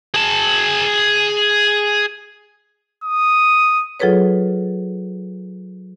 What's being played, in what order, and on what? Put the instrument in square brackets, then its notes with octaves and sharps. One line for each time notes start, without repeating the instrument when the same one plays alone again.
[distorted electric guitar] G#4 A5
[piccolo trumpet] D#6
[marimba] F#3 F4 G#4 A4 B4 C#5